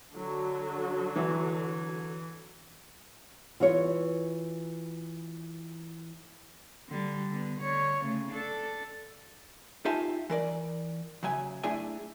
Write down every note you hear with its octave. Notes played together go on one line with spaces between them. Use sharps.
D3 F#3
E3
E3 F4 B4 C#5
D3 G3
D3 B3
D3 C#5
C#3 A3
D4 A4
D#4 F4 G4 E5 G#5 A5
E3 A#4 D5
C#3 F#3 E5 G#5
A3 D4 E4 G#4 E5 G#5